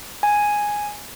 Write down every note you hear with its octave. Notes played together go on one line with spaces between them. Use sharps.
G#5